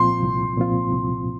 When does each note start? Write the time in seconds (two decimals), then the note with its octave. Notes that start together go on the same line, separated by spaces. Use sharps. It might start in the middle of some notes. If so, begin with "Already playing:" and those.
Already playing: C2 A#2 F3 C4 F4 C6
0.22 C2
0.57 A#2 F3 C4 F4
0.92 C2